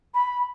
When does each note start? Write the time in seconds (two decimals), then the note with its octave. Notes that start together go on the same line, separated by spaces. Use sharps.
0.14 B5